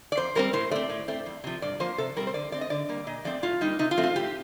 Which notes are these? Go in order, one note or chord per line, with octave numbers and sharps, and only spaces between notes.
D5
F2 C5
D3 G3 C4 A#4
A2 C5
A3 C4 D5
A2
A3 C4
F2
C3 F3
G2 D5
F3 A#3 C5
C3 A4
G3 C4 A#4
C5
D3 D5
A3 C4 D5
D#5
D3 D5
G3 A#3
A#2 D#5
F3 A3 C4 D5
A2 F4
G3 A#3 D#4
C3 D#4
F4
F3 A3 C4
F4
A2 G4